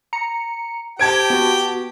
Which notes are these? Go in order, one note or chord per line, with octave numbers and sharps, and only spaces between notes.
A#5 C#7
G4 C5 G5 A5 G#6 D7
B3 F#4